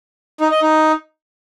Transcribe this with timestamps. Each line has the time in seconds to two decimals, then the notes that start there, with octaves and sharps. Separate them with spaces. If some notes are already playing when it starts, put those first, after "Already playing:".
0.41 D#4
0.52 D#5
0.62 D#4